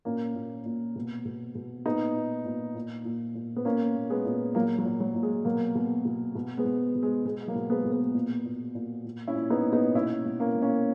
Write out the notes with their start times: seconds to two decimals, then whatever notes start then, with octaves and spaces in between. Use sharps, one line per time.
0.05 A#2 A#3 C#4
0.35 A#2
0.66 A#2
0.96 B2
1.25 B2
1.55 B2
1.85 A#2 B3 D#4
2.16 A#2
2.46 A#2
2.75 A#2
3.05 A#2
3.35 A#2
3.56 B3
3.65 A#2 A#3 C#4
3.95 A#2
4.10 G#3 B3
4.25 A#2
4.55 A#2 F#3 A#3
4.78 F#3
4.85 A#2
5.00 F#3
5.15 A#2
5.23 G#3
5.45 B2 F#3 A#3
5.75 B2
6.05 B2
6.35 B2
6.57 G#3 B3
6.65 B2
6.95 B2
7.03 G#3
7.25 B2 G#3
7.47 F#3 A#3
7.55 B2
7.70 G#3 B3
7.85 B2
7.92 G#3 B3
8.15 A#2
8.45 A#2
8.75 A#2
9.05 A#2
9.27 C#4 E4
9.35 A#2
9.50 B3 D#4
9.65 A#2
9.73 B3 D#4
9.95 B2 C#4 E4
10.25 B2
10.40 A#3 C#4
10.55 B2
10.62 A#3 C#4